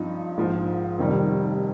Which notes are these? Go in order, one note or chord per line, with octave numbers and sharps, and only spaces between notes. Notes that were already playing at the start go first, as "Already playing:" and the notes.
Already playing: G2 F3 C4 D#4
A#1 G#2 F3
F1 F2 D#3 G3